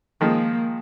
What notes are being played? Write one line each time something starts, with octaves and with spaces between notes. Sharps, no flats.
D#3 F3 G#3 A#3